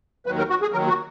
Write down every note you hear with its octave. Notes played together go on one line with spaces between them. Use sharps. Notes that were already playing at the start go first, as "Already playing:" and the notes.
D#2 D#3 F#3 B4
A#4
F#4
G#4
D#2 D#3 F#3 A#4
F#4